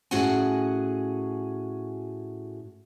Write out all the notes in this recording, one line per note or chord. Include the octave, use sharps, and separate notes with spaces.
A2 C#4 F#4 G#4 F#5 G#5